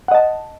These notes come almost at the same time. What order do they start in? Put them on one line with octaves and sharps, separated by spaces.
F#5 D#5 A5